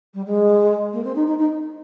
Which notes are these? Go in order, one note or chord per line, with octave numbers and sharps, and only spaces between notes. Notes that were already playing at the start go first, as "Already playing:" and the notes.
G3
G#3
A#3
C4
D#4
D#4
D#4